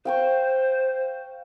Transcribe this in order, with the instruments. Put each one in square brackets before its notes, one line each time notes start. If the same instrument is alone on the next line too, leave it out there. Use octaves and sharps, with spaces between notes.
[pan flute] C5 [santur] F5 G5 C#6